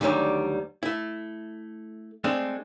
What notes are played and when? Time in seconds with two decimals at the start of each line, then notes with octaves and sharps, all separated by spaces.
0.01 D2 D3 D#3 F#3 G3
0.83 A3 E4
2.24 G#3 A3 C4 D4